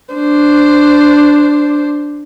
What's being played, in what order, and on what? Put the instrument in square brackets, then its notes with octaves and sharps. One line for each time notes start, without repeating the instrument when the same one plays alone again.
[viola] D4 C5